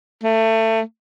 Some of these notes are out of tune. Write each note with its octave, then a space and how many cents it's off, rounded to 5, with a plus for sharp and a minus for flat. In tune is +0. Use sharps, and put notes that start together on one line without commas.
A3 +25